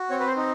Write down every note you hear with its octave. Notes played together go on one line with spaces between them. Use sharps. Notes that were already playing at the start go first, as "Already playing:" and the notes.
Already playing: F#4
C4 C#5
B4
C5
D#4